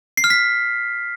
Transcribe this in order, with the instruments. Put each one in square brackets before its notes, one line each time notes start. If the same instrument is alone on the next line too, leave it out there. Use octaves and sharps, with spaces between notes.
[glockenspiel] C7
F6
B6